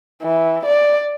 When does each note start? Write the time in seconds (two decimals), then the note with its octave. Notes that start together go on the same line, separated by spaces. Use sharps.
0.22 E3
0.65 D5